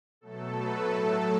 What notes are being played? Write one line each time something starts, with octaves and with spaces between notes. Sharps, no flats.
B2 F#3 A3 A4
B4
A2 F#3 A3 A4